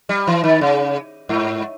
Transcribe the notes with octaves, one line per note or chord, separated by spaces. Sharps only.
G3
E3
D#3
C#3
G#2